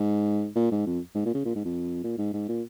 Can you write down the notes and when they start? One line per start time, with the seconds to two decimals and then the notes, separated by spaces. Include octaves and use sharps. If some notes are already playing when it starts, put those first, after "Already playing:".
Already playing: G#2
0.56 A#2
0.72 G#2
0.86 F2
1.15 G#2
1.26 A#2
1.34 C#3
1.45 A#2
1.55 G#2
1.65 F2
2.04 A#2
2.18 G#2
2.34 G#2
2.49 A#2